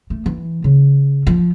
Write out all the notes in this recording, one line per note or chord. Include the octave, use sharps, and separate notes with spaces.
A3
E3
C#3
F3